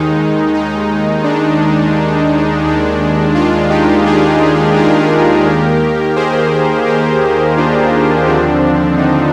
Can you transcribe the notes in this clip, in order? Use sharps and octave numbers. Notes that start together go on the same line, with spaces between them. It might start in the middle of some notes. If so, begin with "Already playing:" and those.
Already playing: D#2 D#3 G#3 D#4
D#4
D4
D#2 D#3 G#3
D4 F4
D#4 G4
F4 G#4
G4 A#4
D#2 D#3 A#3
G#4 C5
G4 A#4
D4 F4
D#2 D3 F3 C4 D4
D#4